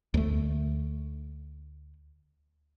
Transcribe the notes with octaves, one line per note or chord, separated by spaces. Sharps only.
D2 A3